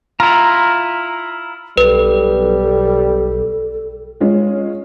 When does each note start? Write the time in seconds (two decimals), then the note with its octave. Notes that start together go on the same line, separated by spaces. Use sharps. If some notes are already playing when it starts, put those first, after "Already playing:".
0.20 E4 F4 A#5
1.77 B1 G3 A4 B4
4.21 G#3 C#4 F4